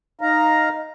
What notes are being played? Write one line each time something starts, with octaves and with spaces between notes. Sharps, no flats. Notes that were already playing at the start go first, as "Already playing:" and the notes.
D#4 F5 A#5